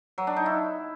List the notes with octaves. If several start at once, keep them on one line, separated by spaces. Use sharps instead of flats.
F#3
D4
D#4
E4